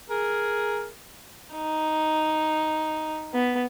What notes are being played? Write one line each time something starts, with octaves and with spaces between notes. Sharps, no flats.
G#4 A#4
D#4
B3